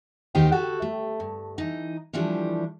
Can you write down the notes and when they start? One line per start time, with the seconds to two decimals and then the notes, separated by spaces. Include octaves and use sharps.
0.35 D#2 D#3 D#4 G4 C5 G5
0.52 F#4 G4 A4
0.82 A3
1.20 G2
1.58 E3 D#4
2.13 E3 F3 G3 A3 D4